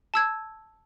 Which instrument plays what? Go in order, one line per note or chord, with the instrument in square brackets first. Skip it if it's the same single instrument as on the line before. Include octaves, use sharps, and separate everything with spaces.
[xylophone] A5 E6 G#6